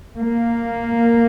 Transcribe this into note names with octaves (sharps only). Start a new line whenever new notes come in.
A#3